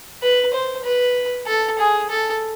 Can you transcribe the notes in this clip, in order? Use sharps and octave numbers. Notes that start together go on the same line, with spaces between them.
B4
C5
B4
A4
G#4
A4